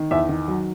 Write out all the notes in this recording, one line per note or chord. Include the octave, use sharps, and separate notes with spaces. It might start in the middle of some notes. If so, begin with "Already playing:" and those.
Already playing: D#3
E2 E5
D#3
F#3